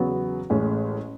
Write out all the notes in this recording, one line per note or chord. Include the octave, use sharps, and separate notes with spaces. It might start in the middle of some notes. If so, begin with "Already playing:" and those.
Already playing: E2 C#3 F#3 B3
A1 A2 G#3 C#4